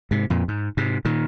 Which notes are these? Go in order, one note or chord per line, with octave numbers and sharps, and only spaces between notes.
G#2 C3
F2 A#2
G#2
G#2 C3
A#2 D#3